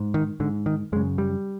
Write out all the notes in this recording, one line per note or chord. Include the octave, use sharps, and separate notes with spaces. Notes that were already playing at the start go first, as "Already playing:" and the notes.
Already playing: G#2
D#3
G#2 D3
D#3
F#2 C#3 G#3
G3